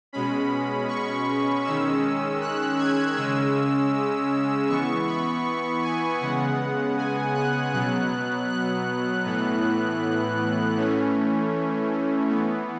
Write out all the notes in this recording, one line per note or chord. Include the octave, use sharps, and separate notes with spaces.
B2 G#3 C#4 B5
C#6
D#3 G#3 C#4 E6
F#6
G#6
C#3 G#3 C#4 E6
E3 B3 C#6
B5
G#5
C#3 G#3 B3 F#5
G#5
F#6
B2 F#3 B3 F#6
F#6
A2 E3 B3
E3 A3 C#4
E3 B3